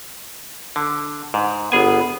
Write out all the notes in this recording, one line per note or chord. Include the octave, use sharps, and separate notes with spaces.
D3
G#2
G1 B3 G#4 G#5